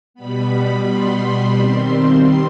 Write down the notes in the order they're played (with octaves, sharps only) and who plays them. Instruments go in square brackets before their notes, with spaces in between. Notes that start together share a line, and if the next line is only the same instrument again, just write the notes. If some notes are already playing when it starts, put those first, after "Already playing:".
[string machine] B2 G3 B3 B5
C6
D#3 G3 C4 C6
C6